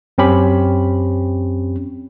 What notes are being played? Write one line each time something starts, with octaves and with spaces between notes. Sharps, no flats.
F#2 C4 C#4 G4 B5